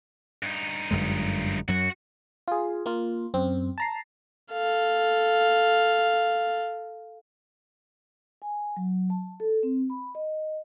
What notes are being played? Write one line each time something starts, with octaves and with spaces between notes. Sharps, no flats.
G2 D#4
G1 F#2 G#3
F#2 F#3 F#4
F4 G#4
A#3 F4
F#2 C4
A5 A#5 C7
A4 F5
G#5
F#3
A5
A4
C4
B5
D#5